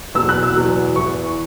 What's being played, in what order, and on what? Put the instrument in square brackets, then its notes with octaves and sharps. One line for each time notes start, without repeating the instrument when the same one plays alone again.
[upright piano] E2 B2 F#3 E6
F#6
E6
E2 B2 F#3
E2 E3 C#6